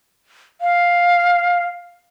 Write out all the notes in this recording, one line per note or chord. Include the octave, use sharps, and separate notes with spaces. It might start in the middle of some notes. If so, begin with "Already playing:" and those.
F5